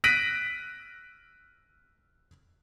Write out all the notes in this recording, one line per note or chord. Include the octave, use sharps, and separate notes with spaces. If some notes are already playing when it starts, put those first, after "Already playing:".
F#6 A#6 B6 D7 D#7 F#7